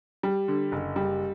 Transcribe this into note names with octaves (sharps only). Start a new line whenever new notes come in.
G3
D3
F#1
G3